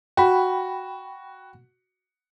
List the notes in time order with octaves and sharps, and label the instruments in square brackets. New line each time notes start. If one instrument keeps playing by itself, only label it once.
[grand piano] F#4 [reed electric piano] G5 B5